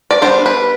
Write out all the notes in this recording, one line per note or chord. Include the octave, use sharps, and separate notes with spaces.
D5
G3 B3 D4 C5
B4